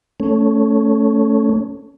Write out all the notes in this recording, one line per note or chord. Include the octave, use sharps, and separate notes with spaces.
A3 C#4